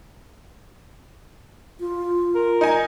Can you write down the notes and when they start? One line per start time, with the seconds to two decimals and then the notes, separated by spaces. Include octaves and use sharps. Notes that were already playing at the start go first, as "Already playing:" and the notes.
1.80 F4
2.35 A#4
2.61 D#4 G#5